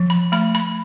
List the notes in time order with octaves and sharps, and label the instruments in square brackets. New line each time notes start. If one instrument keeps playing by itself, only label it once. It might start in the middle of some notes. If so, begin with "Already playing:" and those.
Already playing: [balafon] F3
B5
A3 B5
B5